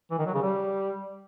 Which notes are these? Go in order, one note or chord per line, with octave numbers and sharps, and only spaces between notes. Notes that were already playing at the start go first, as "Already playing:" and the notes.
E3
D#3
F#3
C#3
G3